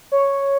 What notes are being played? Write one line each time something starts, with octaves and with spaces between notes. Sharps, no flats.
C#5